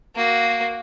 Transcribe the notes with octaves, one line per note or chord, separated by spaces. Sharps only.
A#3 F#4